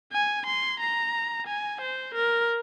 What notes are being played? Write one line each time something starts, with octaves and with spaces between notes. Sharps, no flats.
G#5
C6
A#5
G#5
C5
A#4